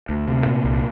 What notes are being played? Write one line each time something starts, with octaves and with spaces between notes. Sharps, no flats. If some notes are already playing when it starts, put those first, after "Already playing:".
D2
C3
A#2
C2